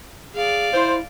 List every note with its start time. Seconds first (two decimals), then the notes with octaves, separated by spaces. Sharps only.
0.35 G#4 D5 F5
0.74 E4 C5